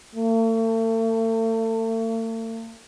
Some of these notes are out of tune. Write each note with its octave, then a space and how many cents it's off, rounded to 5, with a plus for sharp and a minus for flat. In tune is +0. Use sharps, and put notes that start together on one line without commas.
A3 +40